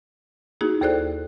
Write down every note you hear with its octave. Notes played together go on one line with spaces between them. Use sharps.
A#3 D#4 E4 F#4 G#4
D#2 G#4 A4 C5 D5 F#6